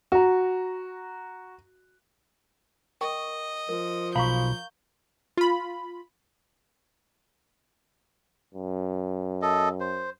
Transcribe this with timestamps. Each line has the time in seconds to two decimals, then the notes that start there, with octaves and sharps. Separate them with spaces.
0.12 F#4 A#5
3.01 A#4 D#5 G5 C#6
3.69 F3 A#4
4.15 B1 F5 A#5 B5 C#6 G6
5.37 F4 B5
8.55 F#2
9.42 A4 D#5
9.80 C5